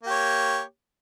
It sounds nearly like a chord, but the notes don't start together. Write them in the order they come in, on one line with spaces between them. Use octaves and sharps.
A#3 G4 C#5